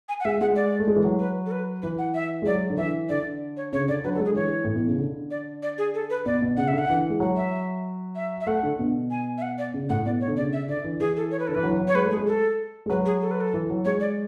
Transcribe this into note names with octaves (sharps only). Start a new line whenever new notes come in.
G#5
F#5
G#3 E5
G#3 F#5
D5
A3
G#3
E3
F#3
B4
A4
B4
E3 B4
F#5
E5
G#3
F#3 D5
D3
E3 E5
D3 D5
C#5
C#3 C#5
D3 D5
F#3 B4
F#3 A4
G#3
G#4
D3
E3 C#5
A2
B2
C#3
D3
D5
D5
G#4
A4
B4
B2 D5
B2
C#3 F#5
D3 E5
F#5
E3
G#3
F#3 F#5
E5
E5
E5
A3 F#5
D3
B2
G#5
E5
F#5
D5
C#3
A2 F#5
B2 D5
C#5
D3
C#3 D5
E5
D3 D5
E3
E3 G#4
A4
C#5
B4
D3 A4
E3 B4
F#3
E3
F#3
C#5
G#3 B4
A3
G#4
G#3
A4
G#3
F#3 B4
G#4
A4
B4
A4
E3
F#3
G#3 C#5
D5